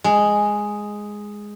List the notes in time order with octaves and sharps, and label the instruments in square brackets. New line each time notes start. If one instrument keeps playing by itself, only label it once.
[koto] G#3